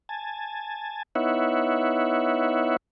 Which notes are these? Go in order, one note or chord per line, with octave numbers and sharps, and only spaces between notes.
G#5 A5
B3 D#4 E4 C#5 E5 F#5